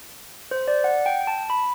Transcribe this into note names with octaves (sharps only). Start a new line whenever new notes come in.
C5
D5
F#5
G5
A5
B5